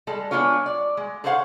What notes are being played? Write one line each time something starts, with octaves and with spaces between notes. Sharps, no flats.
G3 G#3 A4
G#3 B3 D4 F4 C#5
D5
G#3
G#4 A4 C5 C#5 F5 F#5